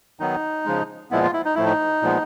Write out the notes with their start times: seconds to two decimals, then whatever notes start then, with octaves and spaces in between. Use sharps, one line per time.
0.20 D#3 F#3 B3 D#4
0.66 C#3 F3 G#3
1.11 A#2 F3 G#3 B3 E4
1.23 F4
1.34 E4
1.45 D#4
1.55 A2 F3 A3 E4
1.66 D#4
2.02 A#2 F3 G#3 B3